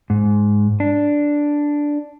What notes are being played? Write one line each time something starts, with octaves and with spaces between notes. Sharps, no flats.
G#2
D4